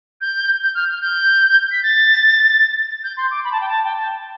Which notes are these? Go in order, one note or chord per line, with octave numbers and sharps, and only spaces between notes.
G6
G6
F6
F6
G6
B6
A6
G6
C6
D6
B5
A5
G5
A5
G5
A5